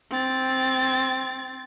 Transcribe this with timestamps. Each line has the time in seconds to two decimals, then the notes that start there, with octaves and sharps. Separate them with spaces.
0.10 C4 A6